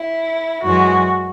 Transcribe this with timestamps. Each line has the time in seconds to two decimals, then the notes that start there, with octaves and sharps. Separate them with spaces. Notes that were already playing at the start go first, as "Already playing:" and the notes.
Already playing: E4
0.63 F#2 E3 G#3 F#4